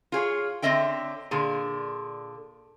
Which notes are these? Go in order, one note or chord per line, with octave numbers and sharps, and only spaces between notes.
F4 G#4 C#5
D3 C4 C#5 D#5 E5 G5
A#2 D3 G#4